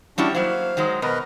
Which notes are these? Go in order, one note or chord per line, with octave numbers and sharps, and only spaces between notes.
G3 C#4 D4 E4 F#4
F#3 A#3 E4 C5 F5
D#3 F#3 G#3
B2 A#4 B4 D#5